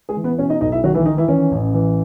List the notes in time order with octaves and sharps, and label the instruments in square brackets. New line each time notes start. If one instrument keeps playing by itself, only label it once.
[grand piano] G#3 G#4
E3
B3 B4
B2 C#4 C#5
D#4 D#5
B1 D#4 D#5
E4 E5
D#3 F#3 F#4
E3 E4
D#3 D#4
E3 E4
E3 C#4
A1
E3